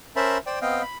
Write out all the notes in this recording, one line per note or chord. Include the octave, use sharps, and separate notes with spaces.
C#4 A#4 C5 E5 A5 B5
C5 D5 G5
B3 C4 D#5 F5 G5
B5